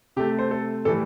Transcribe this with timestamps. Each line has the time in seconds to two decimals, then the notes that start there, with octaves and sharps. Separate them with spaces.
0.16 C3 A3 G4
0.39 C5
0.51 A4
0.85 A2 E3 G3 A4